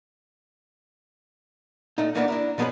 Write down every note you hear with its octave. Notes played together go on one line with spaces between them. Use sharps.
A#2 A3 D#4
A#2 E3 A#3 B3 C#4 D4
D4 E4 A#4
B2 F3 B3 G#4 C#5 B5